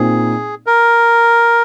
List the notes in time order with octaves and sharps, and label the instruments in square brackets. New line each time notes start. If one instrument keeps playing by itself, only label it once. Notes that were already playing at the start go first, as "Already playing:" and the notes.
Already playing: [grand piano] A#2 C4 D#4 [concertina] G#4
[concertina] A#4